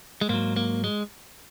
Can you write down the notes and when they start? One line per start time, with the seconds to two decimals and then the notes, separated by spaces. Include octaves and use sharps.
0.21 G#3
0.29 G#2 F#3 A#3
0.56 A#3
0.84 G#3